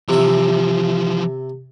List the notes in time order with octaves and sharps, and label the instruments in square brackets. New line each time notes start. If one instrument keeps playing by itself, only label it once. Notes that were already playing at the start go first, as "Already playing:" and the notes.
[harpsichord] C3 E5 [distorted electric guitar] E3 F3